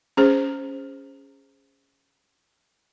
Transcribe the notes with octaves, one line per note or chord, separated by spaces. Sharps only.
C#4 G#4 C5